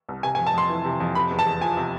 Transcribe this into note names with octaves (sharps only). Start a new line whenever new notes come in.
C2
C3 G#5
G#5
F2
A5
F2 C6
E3
C3
F2
C3 B5
E2
A5
E2
F3 G#5
C3